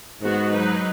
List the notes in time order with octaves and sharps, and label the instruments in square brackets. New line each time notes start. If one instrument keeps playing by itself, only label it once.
[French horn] G#2 [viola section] D#3 B3 F#4
[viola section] F#3 D#4 B4